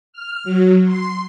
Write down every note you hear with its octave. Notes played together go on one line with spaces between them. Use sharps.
F6
F#3
C6